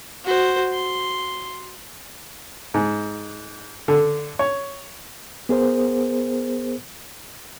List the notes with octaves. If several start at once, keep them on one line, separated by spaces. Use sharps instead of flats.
F#4 C5
C6
G#2
D3
C#5
B3 G#4 A#4 C5